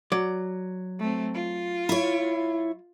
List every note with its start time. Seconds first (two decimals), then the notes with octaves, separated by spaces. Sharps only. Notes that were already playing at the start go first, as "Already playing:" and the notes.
0.12 F#3 D5
0.99 A3 C4
1.34 F4
1.89 E4 C#5